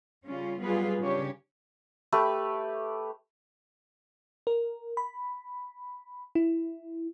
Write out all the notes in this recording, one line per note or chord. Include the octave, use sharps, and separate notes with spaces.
C#3 G3 C#4 F4
F#3 G3 B3 F4 G#4 B4
C#3 C#4 D4 G4 C#5
A3 G4 B4
A#4
B5
E4